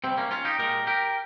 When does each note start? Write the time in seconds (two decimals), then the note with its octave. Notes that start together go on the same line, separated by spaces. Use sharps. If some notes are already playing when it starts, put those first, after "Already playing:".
0.04 C3 G3 C4
0.18 A#3 C#4
0.31 C#4 F4
0.45 D#4 G4
0.59 A#2 G#3 G4 A#4
0.87 G4 A#4